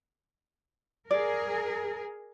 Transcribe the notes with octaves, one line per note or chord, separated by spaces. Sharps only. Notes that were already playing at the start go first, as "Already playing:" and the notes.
G#4 A#4 D5